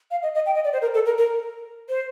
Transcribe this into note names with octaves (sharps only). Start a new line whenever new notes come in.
F5
D#5
D#5
G5
D#5
D5
C5
A#4
A4
A#4
A#4
C5